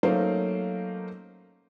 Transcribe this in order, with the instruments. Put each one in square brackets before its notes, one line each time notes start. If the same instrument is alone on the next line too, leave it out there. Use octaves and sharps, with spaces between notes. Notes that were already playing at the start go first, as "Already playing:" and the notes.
[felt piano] F#3 A3 A#3 C#4 D#4 C5